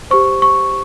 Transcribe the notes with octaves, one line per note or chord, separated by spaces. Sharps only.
G4 C5 C#6
C#6